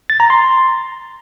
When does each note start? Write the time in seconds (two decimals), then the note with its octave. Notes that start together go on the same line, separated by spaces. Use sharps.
0.10 A6
0.20 A#5
0.30 C6